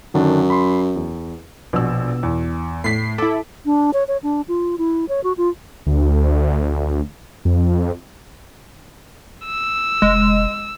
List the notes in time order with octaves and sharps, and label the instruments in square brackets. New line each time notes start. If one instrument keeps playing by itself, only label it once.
[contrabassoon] F#2 [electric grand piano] D3 D#3 D4
[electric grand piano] B5 C6
E2
[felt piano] A#1 E6 [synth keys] B2
[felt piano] E2
[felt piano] A2 B6 [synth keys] C7
[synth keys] E4 A4 [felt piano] D6
[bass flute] D4
C#5
C#5
D4
F4
E4
C#5
F#4
F4
[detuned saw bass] D2
F2
[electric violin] E6
[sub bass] F1 [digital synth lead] G#3